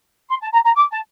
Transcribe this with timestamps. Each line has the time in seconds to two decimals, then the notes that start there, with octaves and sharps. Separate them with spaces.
0.29 C6
0.41 A5
0.52 A#5
0.64 A#5
0.75 D6
0.91 A5